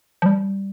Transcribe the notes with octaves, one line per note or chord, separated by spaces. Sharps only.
F3
G3